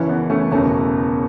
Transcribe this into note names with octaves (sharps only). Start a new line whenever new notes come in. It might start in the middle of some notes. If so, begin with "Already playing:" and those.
Already playing: F#1 F#2 C#3 E3 C#4 E4
B3
A3 C#4
F#1 E2 B2 A3 C#4